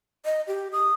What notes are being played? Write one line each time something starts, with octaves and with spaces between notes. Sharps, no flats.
D#5
G4
D#6